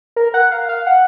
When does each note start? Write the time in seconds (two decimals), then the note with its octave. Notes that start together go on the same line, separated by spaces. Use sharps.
0.16 A#4
0.34 F#5
0.51 F5
0.69 F5
0.87 F#5